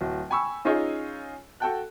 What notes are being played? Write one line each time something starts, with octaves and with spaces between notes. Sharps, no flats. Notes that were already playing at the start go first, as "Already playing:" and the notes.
D1 F#3
G5 G#5 B5 C#6 E6
C#4 D#4 F4 G#4 C#5 D#5
F#4 A4 F#5 G5 A5 F#6